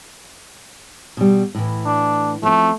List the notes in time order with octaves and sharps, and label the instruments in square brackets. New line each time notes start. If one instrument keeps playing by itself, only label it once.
[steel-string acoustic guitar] B2 G3
A2 E3
[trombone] D4
[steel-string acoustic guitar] F3 C4 [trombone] A3